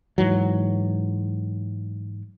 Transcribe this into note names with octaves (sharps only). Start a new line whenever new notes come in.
G#2 E3 F#3